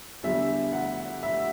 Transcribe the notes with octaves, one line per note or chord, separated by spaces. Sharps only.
E2 D3 G3 E5
F#5
E5